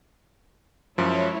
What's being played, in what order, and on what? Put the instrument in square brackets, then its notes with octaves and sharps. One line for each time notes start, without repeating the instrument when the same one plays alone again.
[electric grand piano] F#2 F3 [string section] G#3 E4 C#5